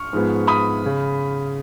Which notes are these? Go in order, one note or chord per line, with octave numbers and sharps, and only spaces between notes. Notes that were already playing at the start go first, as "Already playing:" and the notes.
Already playing: C#6 F6
G#2 F3 G#3 B3
B5 D#6
C#3